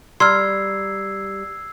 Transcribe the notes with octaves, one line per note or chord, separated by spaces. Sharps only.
G3 A#5 C6 E6 F6 G#6 C7